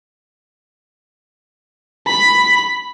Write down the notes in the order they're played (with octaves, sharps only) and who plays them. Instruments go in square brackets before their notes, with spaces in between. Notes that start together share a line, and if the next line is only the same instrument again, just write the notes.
[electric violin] B5